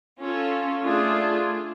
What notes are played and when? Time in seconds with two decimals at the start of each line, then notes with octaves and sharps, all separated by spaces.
0.19 C#4 F4 A4
0.83 A3 D4 F4 G#4